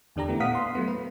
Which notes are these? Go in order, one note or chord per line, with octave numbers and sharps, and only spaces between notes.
E2 D3 D4 G4 A#5
A3 B3 E4
A#2 B3 F5 F#5 D#6 B6
C6
F#3 A3 B3
B4